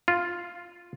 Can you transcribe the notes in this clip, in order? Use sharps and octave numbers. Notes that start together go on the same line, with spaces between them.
F4